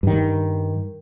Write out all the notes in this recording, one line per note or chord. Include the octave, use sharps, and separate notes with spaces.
G2 D#3